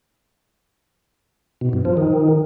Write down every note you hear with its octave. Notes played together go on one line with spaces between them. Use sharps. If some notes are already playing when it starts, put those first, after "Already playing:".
B2
G2
F3
D#3